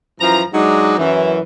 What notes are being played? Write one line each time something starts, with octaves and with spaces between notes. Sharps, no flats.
F#2 E3 F3 A#5
F#3 G#3 D4 D#4
F#2 E3